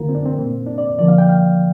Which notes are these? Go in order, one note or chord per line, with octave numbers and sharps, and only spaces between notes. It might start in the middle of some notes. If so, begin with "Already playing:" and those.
Already playing: D3 A#3 F4 A#4
C4
D4
C4
A#2 A#3
D4
D5
D3 F3 A#3 D5
F5
G5
F5